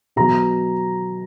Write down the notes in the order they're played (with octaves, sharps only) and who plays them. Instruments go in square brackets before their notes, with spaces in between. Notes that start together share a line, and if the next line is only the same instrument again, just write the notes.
[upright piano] B2 F#3 A#5